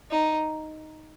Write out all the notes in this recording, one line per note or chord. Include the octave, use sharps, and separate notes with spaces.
D#4